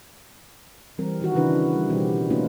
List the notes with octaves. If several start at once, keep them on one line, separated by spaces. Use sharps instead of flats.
E3 G3 C4 A#4
D#3 F#4
C#3 E3 D4 E4 B4
G3
B2 E3 G3 C4 G4
A3 A#3 C#4 D#4 F4 B4